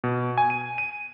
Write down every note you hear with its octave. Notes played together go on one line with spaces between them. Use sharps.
B2
G#5
D#7
D#7